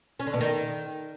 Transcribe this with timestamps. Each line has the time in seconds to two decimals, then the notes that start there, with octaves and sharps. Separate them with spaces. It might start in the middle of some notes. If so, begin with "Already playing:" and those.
0.20 C#4
0.27 D3
0.34 B2
0.41 D#3